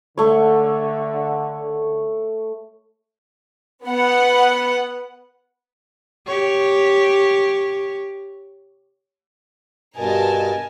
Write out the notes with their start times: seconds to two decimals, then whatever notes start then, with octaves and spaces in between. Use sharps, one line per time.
0.18 D3 A3 C#5
3.86 B3 F#5
6.27 G4 C#5
9.97 G2 B2 A#4 D#5 G#5 A5